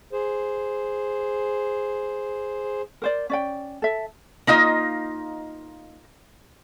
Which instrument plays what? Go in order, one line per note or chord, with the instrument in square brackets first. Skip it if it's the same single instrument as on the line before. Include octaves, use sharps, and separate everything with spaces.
[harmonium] G#4 C5
[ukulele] A#4 C5 D5
C#4 D5 G5
A4 E5
[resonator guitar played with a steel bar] A#3 D#4 F4 D#5